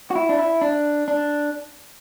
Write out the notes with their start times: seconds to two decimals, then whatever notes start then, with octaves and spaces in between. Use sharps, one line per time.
0.11 F#4
0.15 E4
0.29 D4
0.39 E4
0.61 D4
1.08 D4